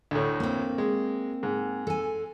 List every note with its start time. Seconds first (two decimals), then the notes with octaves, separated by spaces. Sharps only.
0.11 D2 A2
0.40 A#3 C4
0.78 G#3
1.43 G#2
1.87 A4 G#5